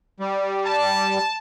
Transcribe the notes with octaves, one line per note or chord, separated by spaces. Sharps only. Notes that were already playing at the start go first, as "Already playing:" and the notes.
G3
A5